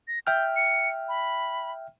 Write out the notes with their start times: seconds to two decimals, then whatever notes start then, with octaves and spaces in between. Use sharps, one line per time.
0.08 A#6
0.27 E5 G5 F6 G6
0.56 C#7
1.09 B5